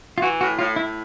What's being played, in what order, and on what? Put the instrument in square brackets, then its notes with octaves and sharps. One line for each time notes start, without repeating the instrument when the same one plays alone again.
[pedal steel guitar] F4
[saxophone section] E3 [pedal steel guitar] F#4
[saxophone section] A2 [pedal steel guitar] F#4
[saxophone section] A2 [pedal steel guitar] F4
[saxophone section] A2 [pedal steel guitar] E4